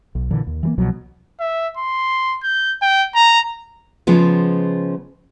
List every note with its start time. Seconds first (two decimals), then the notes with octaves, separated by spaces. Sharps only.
0.15 B1
0.31 A#2 D3 E3
0.47 D#2
0.63 E3 F3 A#3
0.78 C2 B2 F3 F#3
1.40 E5
1.77 C6
2.43 G6
2.82 G5
3.15 A#5
4.07 C#3 F3 G#3 B3